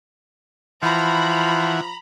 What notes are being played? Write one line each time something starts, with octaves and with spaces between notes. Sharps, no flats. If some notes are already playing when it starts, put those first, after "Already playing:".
E3 F3 F#5 A#5 B5